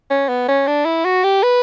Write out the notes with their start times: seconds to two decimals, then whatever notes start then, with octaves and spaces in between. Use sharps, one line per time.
0.10 C#4
0.29 B3
0.48 C#4
0.67 D4
0.86 E4
1.05 F#4
1.24 G4
1.43 B4